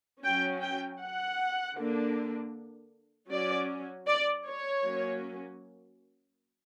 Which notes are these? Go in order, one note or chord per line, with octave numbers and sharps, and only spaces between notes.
F#3 C#4 G5
G5
F#5
D3 A#3 D4
F#3 C#4 D5
D5
C#5
F#3 A#3 C#4